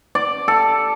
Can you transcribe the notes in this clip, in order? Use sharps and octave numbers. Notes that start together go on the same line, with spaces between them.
D5
A4